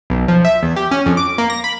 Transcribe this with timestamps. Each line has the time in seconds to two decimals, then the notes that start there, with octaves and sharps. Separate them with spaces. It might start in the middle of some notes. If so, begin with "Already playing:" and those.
0.10 B1
0.28 F3
0.45 E5
0.63 E2
0.76 G4
0.91 C#4
1.06 F2
1.17 D6
1.38 A#3
1.50 A#6
1.64 B5